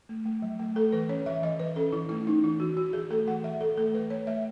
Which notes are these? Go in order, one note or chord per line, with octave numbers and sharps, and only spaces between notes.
A3
A3
F#3
A3
A3 A4
E3 B4
C#4 C#5
E3 E5
E3 D#5
E3 B4
C#4 A4
E3 E4
A3 E4
C#4 D#4
E3 E4
E3 F#4
E3 F#4
E3 G#4
A3 A4
E3 F#5
E3 E5
E3 A4
A3 A4
E3 B4
A3 C#5
A3 E5